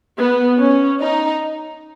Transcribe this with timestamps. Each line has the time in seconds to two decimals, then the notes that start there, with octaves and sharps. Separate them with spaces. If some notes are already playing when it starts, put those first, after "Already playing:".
0.18 B3
0.59 C#4
1.01 D#4